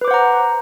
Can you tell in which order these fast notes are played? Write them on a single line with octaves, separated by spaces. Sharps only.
B4 D6 C5 F#5 A#5